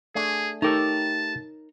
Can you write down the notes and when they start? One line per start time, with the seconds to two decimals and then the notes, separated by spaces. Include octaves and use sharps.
0.15 A3 D4 G#4 G#5
0.62 A3 D#4 G4 A4 A#4 C#5 A5